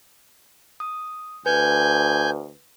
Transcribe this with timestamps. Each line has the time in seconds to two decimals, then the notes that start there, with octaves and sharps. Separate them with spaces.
0.80 D#6
1.46 D2 B4 G#5 G6